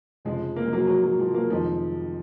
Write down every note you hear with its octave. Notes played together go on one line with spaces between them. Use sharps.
F1 F2 C#3 F3 G#3
A#3
G#3
F#3 A#3
F#3
F#3
F3 G#3
F#3 A#3
F1 F2 D#3 F3 G#3